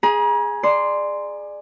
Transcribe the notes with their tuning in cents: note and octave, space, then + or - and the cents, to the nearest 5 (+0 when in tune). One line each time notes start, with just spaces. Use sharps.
G#4 +0 A#5 +40
D5 +25 C6 -5